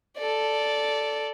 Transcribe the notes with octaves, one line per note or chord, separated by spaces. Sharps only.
A4 D5